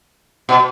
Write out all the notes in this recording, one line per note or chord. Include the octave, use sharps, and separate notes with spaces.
B2